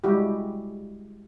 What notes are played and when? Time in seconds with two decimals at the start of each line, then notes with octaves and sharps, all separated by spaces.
0.04 G3 G#3 E4 F#4 G4